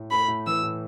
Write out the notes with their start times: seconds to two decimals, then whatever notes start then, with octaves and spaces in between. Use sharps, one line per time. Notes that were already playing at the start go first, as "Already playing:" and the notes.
Already playing: A2
0.11 A3 B5
0.28 A2
0.47 E3 E6
0.63 A2